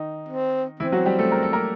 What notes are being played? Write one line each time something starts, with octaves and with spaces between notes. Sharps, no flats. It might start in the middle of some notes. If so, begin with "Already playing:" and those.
Already playing: D#3 D#4
C4
E3 C4 E4
F#3 F#4
G3 G4
A3 A4
A#4
A4
A#3 A#4